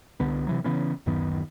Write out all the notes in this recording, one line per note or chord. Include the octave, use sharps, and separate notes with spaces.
C2 D3 B3
C3 E3 F#3
C#3 E3 B3 C#4
D1 F#2 D#3 B3